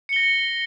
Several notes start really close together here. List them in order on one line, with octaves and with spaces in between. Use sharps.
C#7 G7 A#6